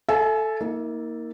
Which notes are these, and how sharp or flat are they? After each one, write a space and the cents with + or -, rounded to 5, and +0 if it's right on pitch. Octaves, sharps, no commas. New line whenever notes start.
A4 +0 E5 +10 G#5 +35
A#3 +0 D#4 +40